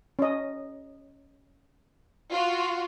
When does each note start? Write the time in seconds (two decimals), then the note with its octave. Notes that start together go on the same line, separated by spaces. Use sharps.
0.19 C#4 D#5
2.31 F4 F#4